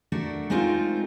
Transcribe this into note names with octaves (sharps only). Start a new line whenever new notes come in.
A3 D4 F#4 A4 A#4
G#3 A3 C4 D#4 F4 A#4